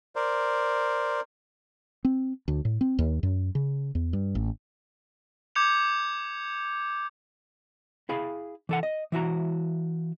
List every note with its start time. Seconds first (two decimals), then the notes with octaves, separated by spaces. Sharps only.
0.16 A#4 C5 D5
2.05 C4
2.48 D2
2.65 A2
2.81 C4
2.99 D#2
3.23 F#2
3.55 C#3
3.95 E2
4.13 G2
4.35 A1
5.55 D6 G6 G#6 C#7 F7
8.09 E4 G#4 F5 B5
8.69 E3 A4 F#5
8.83 D#5
9.12 E3 E4 F#4 A#5